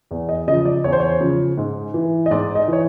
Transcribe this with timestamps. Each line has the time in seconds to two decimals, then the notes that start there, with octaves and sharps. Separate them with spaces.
0.11 E2
0.29 D#5
0.48 C#3 D#5
0.51 F3
0.65 D5
0.84 E2 C#5
0.93 C5
1.00 C#5
1.21 C#3 F3
1.58 G#2
1.94 E3
2.26 D#5
2.31 G#2 D5
2.55 D#5
2.68 E3 C#5